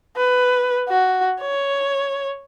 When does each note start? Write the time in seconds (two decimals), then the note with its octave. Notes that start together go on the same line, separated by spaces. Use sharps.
0.17 B4
0.88 F#4
1.41 C#5